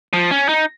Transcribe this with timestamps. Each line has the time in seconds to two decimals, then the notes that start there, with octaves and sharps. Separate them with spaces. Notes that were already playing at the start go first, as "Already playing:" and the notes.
0.13 F3
0.31 C#4
0.49 D#4